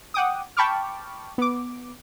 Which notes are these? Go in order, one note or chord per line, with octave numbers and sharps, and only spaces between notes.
F#5 G5 D6 D#6
G5 A5 B5 C#6 D6 F6
B3 D6